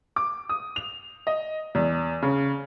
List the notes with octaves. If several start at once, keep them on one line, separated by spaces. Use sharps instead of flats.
D6
D#6
F7
D#5
E2
C#3